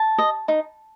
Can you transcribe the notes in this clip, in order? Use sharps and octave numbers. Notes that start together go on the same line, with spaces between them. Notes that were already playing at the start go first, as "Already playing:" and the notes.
Already playing: A5
D#5
D#4